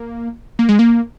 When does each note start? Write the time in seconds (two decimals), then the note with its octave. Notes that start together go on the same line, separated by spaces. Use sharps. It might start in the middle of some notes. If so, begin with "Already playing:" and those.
Already playing: A#3
0.59 A#3
0.69 G#3
0.79 A#3